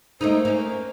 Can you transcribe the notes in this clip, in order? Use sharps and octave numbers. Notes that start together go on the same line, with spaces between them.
A3 A#3 D#4 C5
A#3 C#4